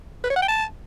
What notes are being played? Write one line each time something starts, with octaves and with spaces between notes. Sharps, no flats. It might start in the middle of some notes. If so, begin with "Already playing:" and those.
B4
C#5
F#5
G5
A5